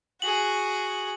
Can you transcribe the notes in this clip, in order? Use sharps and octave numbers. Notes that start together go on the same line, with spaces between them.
F#4 G#4 F#7